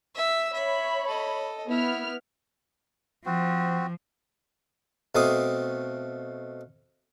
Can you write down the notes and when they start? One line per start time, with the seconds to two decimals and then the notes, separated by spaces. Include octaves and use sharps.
0.14 E5 E6
0.53 C#5 E5 B5
1.07 A4 D#5
1.69 B3 E4 F6
3.26 F3 C4 F#4
5.15 B2 A3 C4 F5 D6 D#6